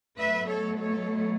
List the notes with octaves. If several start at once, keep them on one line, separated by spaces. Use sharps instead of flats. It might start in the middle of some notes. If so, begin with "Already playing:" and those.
B2 F#3 A3 B4 E5
A4 C#5
A4 C#5